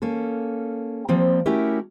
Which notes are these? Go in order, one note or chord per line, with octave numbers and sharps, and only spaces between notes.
A#3 C#4 A4
F3 G3 A#3 C4
A3 C#4 E4 F#4 G4 A#4